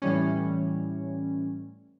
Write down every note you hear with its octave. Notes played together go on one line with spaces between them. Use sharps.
A2 E3 G3 C#4